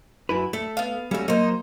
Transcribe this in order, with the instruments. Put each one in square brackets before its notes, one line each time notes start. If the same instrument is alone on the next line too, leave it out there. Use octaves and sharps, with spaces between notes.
[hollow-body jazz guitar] F#2 E4 B4
[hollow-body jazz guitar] A3 [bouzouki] A4
[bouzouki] B3 F5
[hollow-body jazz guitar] G3 A3 [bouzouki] C#4 F#4
[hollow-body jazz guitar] F#3 A#3 [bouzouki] D#4 C5